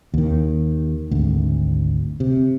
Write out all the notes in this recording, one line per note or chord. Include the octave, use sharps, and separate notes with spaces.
D#2 D#3
G#1 D2
C3